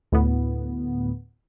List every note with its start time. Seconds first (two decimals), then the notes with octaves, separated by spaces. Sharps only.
0.12 D2 A2 B3